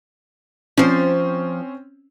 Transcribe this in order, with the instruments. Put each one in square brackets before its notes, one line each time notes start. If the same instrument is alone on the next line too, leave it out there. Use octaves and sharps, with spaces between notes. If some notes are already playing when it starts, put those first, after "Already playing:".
[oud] F3 C5 [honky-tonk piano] C4 C#4